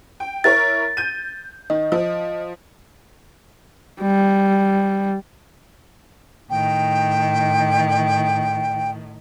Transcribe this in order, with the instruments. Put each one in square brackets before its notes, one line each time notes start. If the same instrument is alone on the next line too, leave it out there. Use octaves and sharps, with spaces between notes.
[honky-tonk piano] G5
[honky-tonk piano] E4 A#4 C#5 [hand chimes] A6
[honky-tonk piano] G6 D#7
[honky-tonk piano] D#3 [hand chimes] D#5
[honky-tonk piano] F3
[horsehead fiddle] G3
[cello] A2 D#3 [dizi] G5